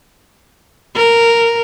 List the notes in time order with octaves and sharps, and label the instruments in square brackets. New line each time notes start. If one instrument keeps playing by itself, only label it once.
[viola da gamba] A#4